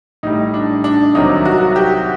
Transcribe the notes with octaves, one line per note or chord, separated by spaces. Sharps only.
A2 G3 D#4
D4
D4
C2 C3 D#3 F#3 D#4
F#4
G4